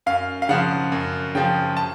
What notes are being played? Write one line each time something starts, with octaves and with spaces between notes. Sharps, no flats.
F#2 F5
F5
C#3 F3 F#5
F#2
C#3 F3 G5
A5